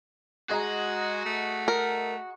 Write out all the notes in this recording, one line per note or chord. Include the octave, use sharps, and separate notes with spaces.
G#3 F#4 G#4 D#5 A#5
A3
A#4